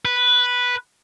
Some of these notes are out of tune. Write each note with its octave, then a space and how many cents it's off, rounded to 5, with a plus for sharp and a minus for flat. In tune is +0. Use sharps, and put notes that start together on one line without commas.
B4 -5